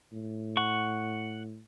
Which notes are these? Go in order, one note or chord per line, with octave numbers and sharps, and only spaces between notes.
A2
F#5 C#6